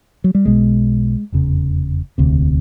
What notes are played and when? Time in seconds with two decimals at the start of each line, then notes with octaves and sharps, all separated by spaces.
0.24 F#3
0.35 G3
0.46 B1 B2 G#3
1.32 F1 E2 C#3
2.18 E1 D2 C3